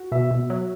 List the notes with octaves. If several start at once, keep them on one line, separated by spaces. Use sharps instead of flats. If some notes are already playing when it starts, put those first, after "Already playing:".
Already playing: F#4
B2 E5
B2
F#3